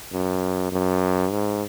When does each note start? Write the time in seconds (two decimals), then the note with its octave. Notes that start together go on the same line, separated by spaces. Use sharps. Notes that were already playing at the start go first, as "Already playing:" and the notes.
0.13 F#2
0.72 F#2
1.32 G#2